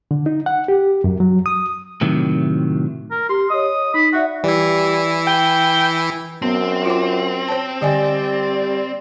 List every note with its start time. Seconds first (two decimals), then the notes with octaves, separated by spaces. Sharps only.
0.11 D3
0.26 D#4
0.46 F#5
0.68 G4
1.04 F#2
1.20 F#3
1.46 D#6
2.01 A2 C3 D#3 F#3
3.11 A#4
3.29 G4 C6
3.50 C#5 D#5 D#6
3.94 D#4 B5
4.13 F#4 D5 E5 F#5
4.44 E3 G3 E4
5.27 G5
6.42 F#2 B3 C4
6.86 F4 C5 D6
7.49 C5 C#5 A5
7.82 D3 G3 D5 D#5 G#5